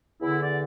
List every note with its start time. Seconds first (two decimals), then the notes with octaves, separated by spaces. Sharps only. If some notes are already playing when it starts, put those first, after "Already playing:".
0.22 E2 D3 E4
0.41 D5